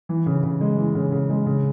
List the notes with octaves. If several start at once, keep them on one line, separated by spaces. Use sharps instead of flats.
E3
C#3
C#3
G#3
E3
C#3
C#3
G#3
C#3